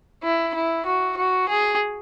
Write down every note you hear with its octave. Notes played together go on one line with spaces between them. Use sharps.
E4
E4
F#4
F#4
G#4